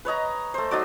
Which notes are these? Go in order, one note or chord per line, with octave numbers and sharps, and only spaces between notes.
B4 C#5 D#5 A#5
A3 C5
F#3 D#4 F#4 D5